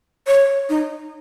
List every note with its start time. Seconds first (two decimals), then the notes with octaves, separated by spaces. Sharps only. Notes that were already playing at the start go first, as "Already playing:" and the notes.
0.27 C#5
0.69 D#4